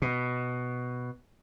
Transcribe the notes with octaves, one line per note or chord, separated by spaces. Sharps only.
B2